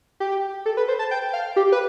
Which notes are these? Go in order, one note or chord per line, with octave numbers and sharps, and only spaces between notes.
G4
A4
B4
C5
A5
G5
F5
G4
B4